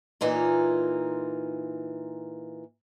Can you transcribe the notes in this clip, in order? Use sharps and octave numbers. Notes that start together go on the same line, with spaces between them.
A#2 E3 D#4 F4